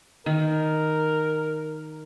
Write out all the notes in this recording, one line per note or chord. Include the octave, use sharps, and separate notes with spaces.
D#3 A#4